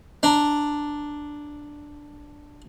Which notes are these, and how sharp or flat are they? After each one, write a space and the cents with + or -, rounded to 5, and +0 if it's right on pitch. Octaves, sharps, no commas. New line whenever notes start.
D4 +0 A#5 +0